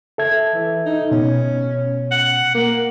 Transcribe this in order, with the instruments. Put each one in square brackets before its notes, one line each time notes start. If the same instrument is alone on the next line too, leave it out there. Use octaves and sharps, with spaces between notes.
[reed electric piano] A4 E5 G#6
[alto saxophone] E3
D#4
[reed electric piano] B2 [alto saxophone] C#4
[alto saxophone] F#5
A#3